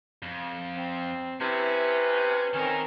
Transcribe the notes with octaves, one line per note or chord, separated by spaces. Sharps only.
F2
C4
C3 C#4 E4 B4
D#3 C4 C#4 D#4 A#4